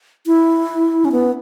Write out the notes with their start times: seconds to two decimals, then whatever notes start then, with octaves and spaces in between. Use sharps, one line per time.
0.27 E4
1.05 C#4
1.12 B3